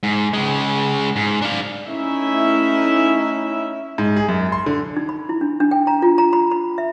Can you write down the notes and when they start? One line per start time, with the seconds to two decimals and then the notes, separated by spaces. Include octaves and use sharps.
0.03 G#2
0.33 C#3 G#3
1.16 G#2
1.42 D4 F5
1.89 A3 C#4 D#4 E4 E5
3.98 G#2
4.16 G#4
4.28 F#2
4.52 C6
4.66 D3
4.97 D#4
5.09 B5
5.29 E4
5.41 D4
5.60 D4
5.71 G5
5.87 A#5
6.02 F4
6.18 A#5
6.33 B5
6.52 B5
6.78 E5